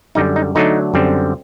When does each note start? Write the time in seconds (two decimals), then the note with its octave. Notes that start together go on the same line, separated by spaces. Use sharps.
0.15 F#2 D3 G3 D#4
0.36 D#4
0.55 D3 F#3 A3 D4 D#4
0.94 F#2 D3 G3 C4